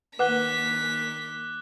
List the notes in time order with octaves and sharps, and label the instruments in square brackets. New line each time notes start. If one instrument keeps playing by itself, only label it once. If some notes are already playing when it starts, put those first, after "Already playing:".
[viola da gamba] D#3 A#3 [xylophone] B4 F#5 [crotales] D6 F#6 G7 [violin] B6